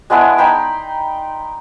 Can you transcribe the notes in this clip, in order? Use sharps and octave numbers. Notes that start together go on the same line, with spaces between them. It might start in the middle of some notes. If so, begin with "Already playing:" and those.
G#3 B3 D4 E4
D#4 G5 B5 C6